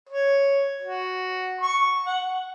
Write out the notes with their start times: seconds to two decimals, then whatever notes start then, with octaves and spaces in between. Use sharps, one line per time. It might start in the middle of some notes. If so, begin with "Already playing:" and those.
0.09 C#5
0.82 F#4
1.61 C#6
2.06 F#5